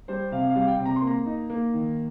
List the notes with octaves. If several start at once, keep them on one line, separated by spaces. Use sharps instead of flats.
G3 C5
C3 F5
F5
G3
F5
G5
C3
A#5
C6
A#3
A#5
D#4
A#3
D#3